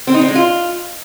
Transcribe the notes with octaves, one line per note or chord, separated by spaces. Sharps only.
C4
D#4
C4
G#3
F4